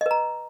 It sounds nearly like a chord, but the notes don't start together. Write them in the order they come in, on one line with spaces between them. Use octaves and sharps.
D#5 B4 A#5